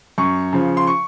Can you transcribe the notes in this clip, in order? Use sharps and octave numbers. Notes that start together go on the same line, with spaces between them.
F#2 C#6
C#3 F3
C6
C#6